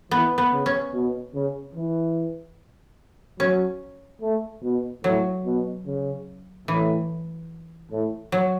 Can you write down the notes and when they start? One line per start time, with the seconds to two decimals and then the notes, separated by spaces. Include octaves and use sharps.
0.11 E3 B3
0.38 B3
0.52 C#3
0.66 C#4
0.93 B2
1.34 C#3
1.75 E3
3.39 F#3 C#4
4.21 A3
4.63 B2
5.04 A2 F#3
5.45 B2
5.86 C#3
6.68 A2 E3
7.92 A2
8.32 F#3